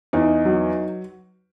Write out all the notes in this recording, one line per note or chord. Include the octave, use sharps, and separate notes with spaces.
E2 D#4
F#3